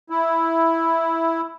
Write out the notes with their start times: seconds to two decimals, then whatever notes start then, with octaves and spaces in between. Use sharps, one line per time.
0.10 E4